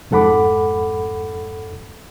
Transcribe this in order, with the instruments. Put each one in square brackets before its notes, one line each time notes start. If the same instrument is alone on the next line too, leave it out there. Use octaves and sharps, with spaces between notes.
[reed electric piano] F2 G#2 A4 F#5 B5 D6